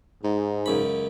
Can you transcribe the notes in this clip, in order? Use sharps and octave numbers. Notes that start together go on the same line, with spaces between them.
G#2
C#2 F#2 B5